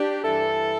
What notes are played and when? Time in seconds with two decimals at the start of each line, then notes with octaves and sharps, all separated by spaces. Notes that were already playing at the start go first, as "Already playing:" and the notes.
Already playing: D4 G4
0.24 G2 E3 E4 A4